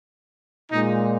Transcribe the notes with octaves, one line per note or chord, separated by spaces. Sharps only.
A#2 G#3 D#4